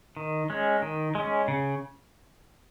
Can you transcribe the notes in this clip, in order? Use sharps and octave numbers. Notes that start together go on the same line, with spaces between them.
D#3
G#3 C#4
D#3
G#3 C#4
C#3